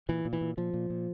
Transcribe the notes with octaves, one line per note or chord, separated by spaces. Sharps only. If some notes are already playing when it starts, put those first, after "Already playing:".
A#2 E3
A#2
E3
A#2
A#2 F3
A#2
A#2